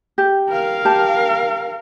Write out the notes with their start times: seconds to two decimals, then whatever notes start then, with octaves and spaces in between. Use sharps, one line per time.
0.18 G4
0.49 A#4 F5
0.85 G4 A5